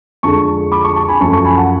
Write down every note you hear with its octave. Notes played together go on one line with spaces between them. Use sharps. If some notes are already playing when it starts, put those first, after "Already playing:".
F2 D3 G#3 A5 C#6
B5 D6
A5 C#6
A5 C#6
G#5 B5
F#2 F3 A3 A5 C#6
A5 C#6
G#5 B5
F#5 A5